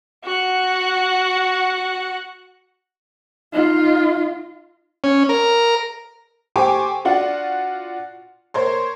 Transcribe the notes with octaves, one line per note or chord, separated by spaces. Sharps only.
F#4 F#5
D#4 F4
C#4
A#4
G4 A4 C5 G#5 C#6 D6
D4 F4 F#4 F#5
A#4 C5 C#5 C6